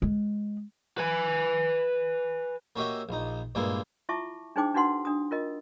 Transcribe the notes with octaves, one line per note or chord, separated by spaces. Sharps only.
G#3
B4 G#5
A#3 C#4 F#4 G4 D#5 E5
A#1 D#4
G2 A#2 G#3 A#3 B3 E4
E4 F4 E5 A5 C#6 D6
D4 D#4 G#4 C5 G5 D6
D4 D#4 F#4 B4 F#5 C6
D4 D#6
F4 A#4 D#5